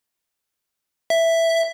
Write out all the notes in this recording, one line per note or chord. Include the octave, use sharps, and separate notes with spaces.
E5